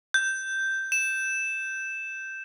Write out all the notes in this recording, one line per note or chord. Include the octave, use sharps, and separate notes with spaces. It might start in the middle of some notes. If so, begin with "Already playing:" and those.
G6
E7